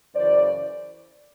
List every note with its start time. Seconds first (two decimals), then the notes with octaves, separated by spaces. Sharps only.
0.15 F#2 C#3 E3 C5 D5